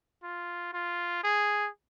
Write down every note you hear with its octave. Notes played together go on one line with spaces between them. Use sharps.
F4
F4
G#4